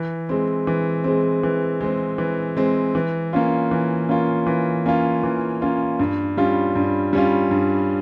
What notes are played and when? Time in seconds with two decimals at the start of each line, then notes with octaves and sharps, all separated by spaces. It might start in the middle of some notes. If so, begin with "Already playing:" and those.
Already playing: E3
0.29 G#3 C4
0.67 E3
1.04 G#3 C4
1.43 E3
1.81 G#3 C4
2.18 E3
2.57 G#3 C4
2.95 E3
3.33 A#3 C#4 F4
3.71 E3
4.09 A#3 C#4 F4
4.47 E3
4.86 A#3 C#4 F4
5.23 E3
5.62 A#3 C#4 F4
5.99 G2
6.37 G3 C#4 F4
6.75 G2
7.13 G3 C#4 F4
7.51 G2